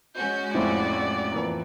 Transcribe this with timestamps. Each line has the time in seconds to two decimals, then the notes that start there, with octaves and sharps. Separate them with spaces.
0.16 G#3 C#4 F#4 G6
0.54 F2 A2 E4 C5 D5 E5
1.32 E3 F3 A#3